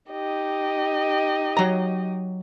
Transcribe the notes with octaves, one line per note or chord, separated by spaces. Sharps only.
D#4 G4 D#5
F#3 A#5